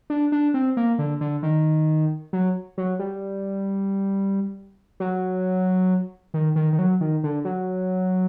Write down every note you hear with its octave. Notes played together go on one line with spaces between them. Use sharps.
D4
D4
C4
A#3
D3
D3
D#3
F#3
F#3
G3
F#3
D#3
D#3
D#3
F#3
D#3
D3
F#3